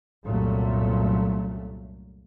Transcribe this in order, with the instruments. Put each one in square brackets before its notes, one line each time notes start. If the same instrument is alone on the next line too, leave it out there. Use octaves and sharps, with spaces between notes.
[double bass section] C2 F#2 A#2 F#3 A3